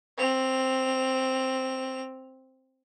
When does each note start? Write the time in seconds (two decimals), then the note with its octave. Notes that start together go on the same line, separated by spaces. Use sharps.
0.18 C4 F7